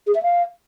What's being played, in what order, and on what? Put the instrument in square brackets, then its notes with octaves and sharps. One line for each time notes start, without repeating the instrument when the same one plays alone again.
[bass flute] G#4
E5
F5